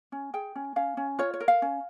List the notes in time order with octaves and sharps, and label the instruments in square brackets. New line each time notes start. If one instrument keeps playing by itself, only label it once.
[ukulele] C#4
G#4 G5
C#4
C#4 F5
C#4
F4 C#5
C#5
A#4
F5
C#4